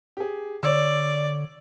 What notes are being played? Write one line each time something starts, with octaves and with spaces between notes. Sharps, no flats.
G4 G#4
D3 C#5 D5 E6